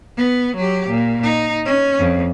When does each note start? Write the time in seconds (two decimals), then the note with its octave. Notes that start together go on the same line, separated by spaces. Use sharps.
0.18 B3
0.56 F#3 G4
0.89 A#2
1.23 D#4
1.65 C#4
1.99 F2